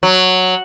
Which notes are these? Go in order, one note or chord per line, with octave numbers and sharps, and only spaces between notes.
F#3